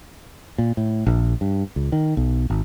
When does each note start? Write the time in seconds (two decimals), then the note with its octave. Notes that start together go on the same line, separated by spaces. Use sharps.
0.58 A#2
0.77 A2
1.06 A#1
1.41 G2
1.76 C#2
1.92 D#3
2.17 B1
2.50 G#1